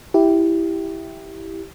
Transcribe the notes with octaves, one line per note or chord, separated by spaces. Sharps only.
E4 G4